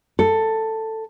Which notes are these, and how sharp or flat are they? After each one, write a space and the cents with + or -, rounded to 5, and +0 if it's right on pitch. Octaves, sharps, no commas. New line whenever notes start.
A4 +10